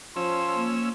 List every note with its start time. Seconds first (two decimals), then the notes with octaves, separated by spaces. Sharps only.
0.16 F3 C#4 C6 E6
0.55 A#3